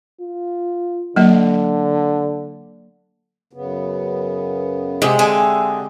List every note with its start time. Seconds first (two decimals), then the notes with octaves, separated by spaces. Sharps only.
0.21 F4
1.16 D3 F#3 A#3 D#5
3.53 F#2 C#3 B3
5.02 C3 G#3 G4 G#4 F#5
5.19 D3 C4 G4 D#5 E5 G#5